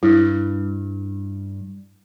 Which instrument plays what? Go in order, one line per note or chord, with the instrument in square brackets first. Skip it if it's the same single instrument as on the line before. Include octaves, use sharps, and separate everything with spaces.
[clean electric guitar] G2 [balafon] E4